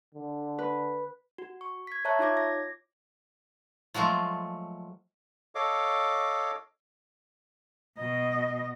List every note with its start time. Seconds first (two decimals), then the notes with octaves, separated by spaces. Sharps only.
0.14 D3
0.58 B4
1.38 F#4
1.61 C#6
1.87 G#6 B6
2.05 C#5 E5 A5 A#5 C#6 F#6
2.19 D#4 F4 C#5 D6 G#6
2.37 A#6
3.94 F3 F#3 G#3 A3 F4
5.55 A4 C#5 D#5 F5 D6
7.98 B2 D#5